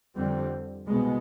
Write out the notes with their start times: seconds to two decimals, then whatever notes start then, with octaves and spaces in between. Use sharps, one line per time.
0.16 F2 D3 G3 C4
0.87 C2 B2 G#3 B3